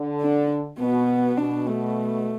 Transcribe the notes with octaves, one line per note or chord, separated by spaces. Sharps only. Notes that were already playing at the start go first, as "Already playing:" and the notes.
Already playing: D3
D4
B2 B3
B2 D4
A3